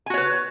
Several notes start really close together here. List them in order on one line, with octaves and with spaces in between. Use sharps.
G#5 F#4 C#5 B4